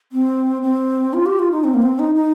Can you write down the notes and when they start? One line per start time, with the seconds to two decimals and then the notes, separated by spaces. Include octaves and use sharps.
0.12 C4
0.62 C4
1.14 F4
1.26 G4
1.39 F4
1.52 D#4
1.64 C4
1.74 A#3
1.82 C4
1.99 D#4
2.15 D#4